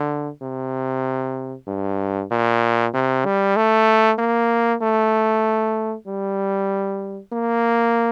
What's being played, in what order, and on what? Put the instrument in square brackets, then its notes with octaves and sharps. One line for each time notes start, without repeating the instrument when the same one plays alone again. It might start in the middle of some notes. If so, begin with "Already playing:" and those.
Already playing: [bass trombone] D3
C3
G2
A#2
C3
G3
A3
A#3
A3
G3
A#3